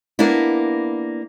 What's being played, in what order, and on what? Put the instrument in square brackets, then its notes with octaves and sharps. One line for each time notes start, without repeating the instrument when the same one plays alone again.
[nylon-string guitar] A#3 B3 D4 E4